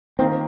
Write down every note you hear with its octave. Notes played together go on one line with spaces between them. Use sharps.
D#3 A#3 C4 F4